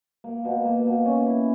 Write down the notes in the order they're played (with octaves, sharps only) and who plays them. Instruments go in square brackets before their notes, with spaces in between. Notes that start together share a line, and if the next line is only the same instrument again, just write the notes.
[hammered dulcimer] A#3
B2
A#3
B2
C#4
E4